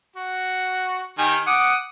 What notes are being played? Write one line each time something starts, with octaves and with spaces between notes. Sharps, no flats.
F#4
D#3 G4 G#5
F#5 D6 D#6